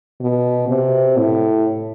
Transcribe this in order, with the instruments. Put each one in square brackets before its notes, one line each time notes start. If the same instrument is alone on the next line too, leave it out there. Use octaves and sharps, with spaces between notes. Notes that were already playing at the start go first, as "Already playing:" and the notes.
[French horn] B2
C3
A2